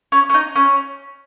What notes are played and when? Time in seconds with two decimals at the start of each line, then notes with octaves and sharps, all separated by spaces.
0.12 C#4
0.29 C#4
0.34 D#4
0.55 C#4